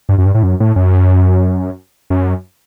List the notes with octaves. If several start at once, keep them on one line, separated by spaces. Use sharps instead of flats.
G2
F#2
G2
A2
F#2
A2
F#2
F#2